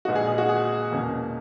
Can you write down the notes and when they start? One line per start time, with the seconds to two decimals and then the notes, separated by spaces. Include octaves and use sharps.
0.05 A#1 A#2 G#3 B3 D#4 F#4
0.16 G#4
0.27 G#4
0.38 F#4
0.49 G#4
0.92 E1 E2 B2 A#3 C#4